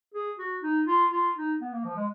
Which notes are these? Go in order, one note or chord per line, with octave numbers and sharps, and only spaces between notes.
G#4
F#4
D#4
F4
F4
D#4
B3
A#3
F3
G#3